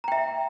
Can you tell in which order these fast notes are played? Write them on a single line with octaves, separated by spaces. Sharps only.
A#5 G5 E5